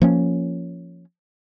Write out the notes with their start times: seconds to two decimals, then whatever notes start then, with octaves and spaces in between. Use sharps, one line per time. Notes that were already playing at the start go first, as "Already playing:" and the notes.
0.02 F3 A#3 C#4